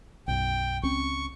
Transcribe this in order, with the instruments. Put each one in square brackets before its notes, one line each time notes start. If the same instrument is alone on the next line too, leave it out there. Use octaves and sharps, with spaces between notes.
[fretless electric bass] B1 F#2 [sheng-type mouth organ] G5
[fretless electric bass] C#2 C4 C#4 [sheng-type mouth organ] C#6